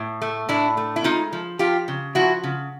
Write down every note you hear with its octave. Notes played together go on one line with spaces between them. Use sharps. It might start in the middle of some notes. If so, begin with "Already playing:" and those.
Already playing: A2
A3
A2 D4 E4
A3
E4
G#3 D#4 F4
F3
F3 F4 G4
C#3
F3 E4 F#4
C#3